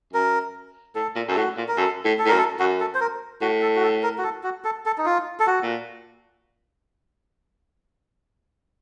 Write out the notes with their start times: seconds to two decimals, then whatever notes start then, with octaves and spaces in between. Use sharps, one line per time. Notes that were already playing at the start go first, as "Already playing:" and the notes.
0.13 F#2 A#4
0.95 A2 A4
1.16 A#2
1.28 F#2 A4
1.36 A2 F#4
1.57 A#2
1.68 A#4
1.77 F#2 A4
2.05 A2
2.19 A4
2.26 A2
2.28 F#2 A#4
2.38 A4
2.59 F#2 F#4
2.80 A4
2.95 C5
3.01 A#4
3.41 A2 F#4
3.62 A4
3.76 F#4
3.83 A4
4.03 A#4
4.18 F#4
4.24 A4
4.43 F#4
4.64 A4
4.86 A4
4.98 D#4
5.06 F4
5.40 A4
5.47 F#4
5.63 A#2